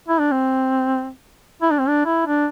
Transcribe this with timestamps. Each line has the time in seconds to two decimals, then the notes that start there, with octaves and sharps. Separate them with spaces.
0.08 E4
0.20 D4
0.32 C4
1.62 E4
1.71 D4
1.79 C4
1.88 D4
2.06 E4
2.27 D4